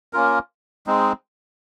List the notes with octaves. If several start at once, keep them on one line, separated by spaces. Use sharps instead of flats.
A#3 C#4 F4 A#4
G#3 C4 D#4